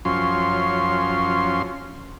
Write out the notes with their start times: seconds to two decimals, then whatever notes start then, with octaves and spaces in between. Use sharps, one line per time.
0.05 F#2 F3 C#4 C6